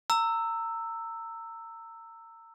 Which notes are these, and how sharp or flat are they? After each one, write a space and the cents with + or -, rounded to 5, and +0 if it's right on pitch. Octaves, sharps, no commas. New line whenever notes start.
A#5 -30 E6 +0